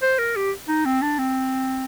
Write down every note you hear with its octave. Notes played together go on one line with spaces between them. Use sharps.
C5
A#4
G4
D#4
C4
D4
C4